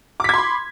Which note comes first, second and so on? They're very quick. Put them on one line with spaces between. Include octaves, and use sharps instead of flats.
D6 B6 G#6 C6 B5